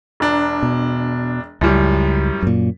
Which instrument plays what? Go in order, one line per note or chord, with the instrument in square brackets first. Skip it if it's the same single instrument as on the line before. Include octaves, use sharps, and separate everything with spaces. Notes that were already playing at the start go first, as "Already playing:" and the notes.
[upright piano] E1 D4 A#5
[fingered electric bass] B2
[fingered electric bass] C#2 [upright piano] F#2 A2 G3
[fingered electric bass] F#2 A#2